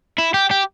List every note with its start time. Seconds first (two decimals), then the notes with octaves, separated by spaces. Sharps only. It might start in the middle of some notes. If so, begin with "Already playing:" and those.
0.19 E4
0.34 G4
0.51 G4